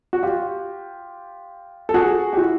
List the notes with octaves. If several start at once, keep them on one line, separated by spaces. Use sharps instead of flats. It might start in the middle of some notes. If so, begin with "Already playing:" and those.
F#4
F4 G4
A4
F#4 G#4
G4
E4 F#4